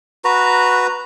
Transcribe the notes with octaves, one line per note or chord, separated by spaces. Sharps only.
F#4 B4 A#5